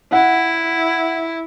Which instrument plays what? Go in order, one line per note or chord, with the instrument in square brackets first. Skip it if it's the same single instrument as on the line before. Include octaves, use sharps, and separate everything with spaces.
[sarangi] E4 [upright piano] F#5